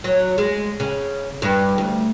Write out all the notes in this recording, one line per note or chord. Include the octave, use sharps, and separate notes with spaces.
F#3
G#3
C#3
G2
D2